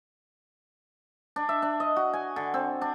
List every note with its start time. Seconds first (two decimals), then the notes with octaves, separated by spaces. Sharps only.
1.36 D4
1.49 E5
1.62 D4
1.80 D#5
1.96 F#4
2.13 G#5
2.36 D3
2.54 C4
2.81 D4